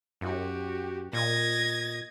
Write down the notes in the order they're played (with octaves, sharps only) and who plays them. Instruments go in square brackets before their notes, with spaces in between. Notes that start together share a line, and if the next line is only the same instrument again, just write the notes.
[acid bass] F#2 [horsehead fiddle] F#4 G4
[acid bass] A#2 [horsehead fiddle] D#5 [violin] G#6 A#6